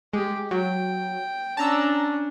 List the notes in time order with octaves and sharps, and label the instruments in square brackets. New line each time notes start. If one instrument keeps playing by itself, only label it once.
[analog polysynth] G#3 [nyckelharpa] G4
[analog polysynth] F#3 [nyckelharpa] G5
[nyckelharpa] C#4 D4 [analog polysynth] A5 A#5 E6